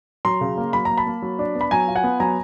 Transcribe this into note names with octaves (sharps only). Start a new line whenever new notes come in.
F#3 A#5 C6
C#3
A#3
F#3 B5
A#3 A#5
A5 B5
A#3
F#3
D4
B3
B5
F#3 G#5 A#5
F4
F#5 G#5
B3
F#3 G#5 A#5